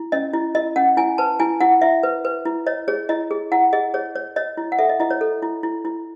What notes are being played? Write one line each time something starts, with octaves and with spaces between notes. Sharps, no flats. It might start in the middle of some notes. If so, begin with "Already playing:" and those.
Already playing: E4
C#4 D#5
E4
E4 D#5
C#4 F#5
E4 G#5
B4 A5
E4 G#5
E4 F#5
E4 E5
B4
B4
E4
C#5 D#5
G#4 C#5
E4 D#5
G#4
E4 F#5
G#4 D#5
G#4 C#5
C#5
C#5 D#5
E4
F#5
A4 E5
D#5
E4 D#5
C#5
A4
E4
E4
E4